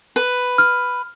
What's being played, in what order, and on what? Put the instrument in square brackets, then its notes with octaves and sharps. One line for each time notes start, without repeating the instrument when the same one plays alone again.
[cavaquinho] B4
[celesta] F6